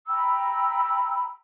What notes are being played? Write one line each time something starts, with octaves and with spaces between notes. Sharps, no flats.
G5 A#5 B5 E6